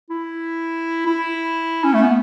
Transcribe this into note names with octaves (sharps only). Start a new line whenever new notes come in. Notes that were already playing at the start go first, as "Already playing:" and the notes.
E4
E4
C#4
A3
B3